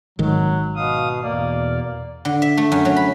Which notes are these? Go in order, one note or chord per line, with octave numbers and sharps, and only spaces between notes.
G#1 D#3 F#3
B2 F5 D#6
E2 B2 A#3 D5
D3
E5
A3
F#2
F#3
B5